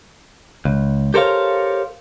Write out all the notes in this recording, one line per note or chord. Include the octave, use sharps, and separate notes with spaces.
C#2
G4 A4 A#4 C5 C#5 F5